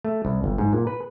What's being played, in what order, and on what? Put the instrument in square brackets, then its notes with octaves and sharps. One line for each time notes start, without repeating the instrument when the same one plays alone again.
[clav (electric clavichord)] A3
C2
G1
G#2
A#2
B4